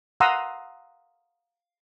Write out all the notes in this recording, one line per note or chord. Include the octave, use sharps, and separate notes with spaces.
F5 F#5 A#5 C6 D#6 E6